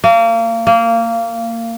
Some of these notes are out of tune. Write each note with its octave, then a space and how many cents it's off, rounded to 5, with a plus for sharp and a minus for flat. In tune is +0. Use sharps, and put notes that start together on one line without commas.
A#3 -30
A#3 -20